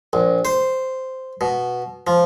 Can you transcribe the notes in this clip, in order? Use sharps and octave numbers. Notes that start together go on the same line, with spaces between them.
A#1
C5
B2
F3